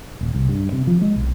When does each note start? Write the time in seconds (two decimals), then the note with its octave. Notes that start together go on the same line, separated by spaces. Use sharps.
0.21 D#1
0.34 C2
0.48 G2
0.72 C3
0.87 F3
1.01 G#3
1.16 B1